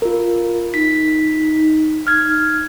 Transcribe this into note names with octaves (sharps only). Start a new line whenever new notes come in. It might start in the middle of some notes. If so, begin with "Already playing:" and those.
F4 A#4
D#4 B6
F6 G#6